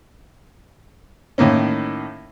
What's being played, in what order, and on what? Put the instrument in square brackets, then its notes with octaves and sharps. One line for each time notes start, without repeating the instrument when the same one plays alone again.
[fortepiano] A2 D#3 A#3 C#4